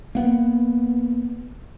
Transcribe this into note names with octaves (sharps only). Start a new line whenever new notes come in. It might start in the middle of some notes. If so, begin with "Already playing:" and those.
A#3 B3